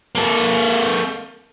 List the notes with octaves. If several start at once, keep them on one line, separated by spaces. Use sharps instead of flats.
A#3 A4